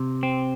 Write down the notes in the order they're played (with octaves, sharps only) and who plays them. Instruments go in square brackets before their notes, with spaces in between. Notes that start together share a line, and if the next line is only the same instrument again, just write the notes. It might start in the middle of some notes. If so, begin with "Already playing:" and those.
Already playing: [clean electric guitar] C3
C4